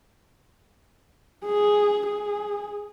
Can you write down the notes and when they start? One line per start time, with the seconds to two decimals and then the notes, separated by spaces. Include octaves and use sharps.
1.45 G#4
2.07 G#4